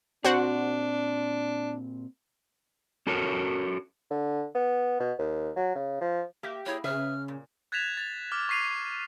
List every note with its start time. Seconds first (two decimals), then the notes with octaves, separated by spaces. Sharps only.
0.24 A#2 C4 D4 F#4 C5 F#5
3.07 C#4 F#4 A4 A#4 C#5
4.11 D3
4.55 B3
5.00 B2
5.19 D#2
5.56 F#3
5.76 C#3
6.01 F3
6.43 A#3 G4 E5
6.66 A#3 E4 G#4 C#5
6.84 C#3 G#4 B4 E5 F6
7.28 A#2
7.72 F#6 G#6 A6 B6 E7 F7
7.97 A6 F7
8.32 D6 F6
8.49 C#6 B6 C7 D#7 F7